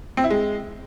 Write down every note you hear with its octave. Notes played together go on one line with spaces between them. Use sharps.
C4
E4
G#3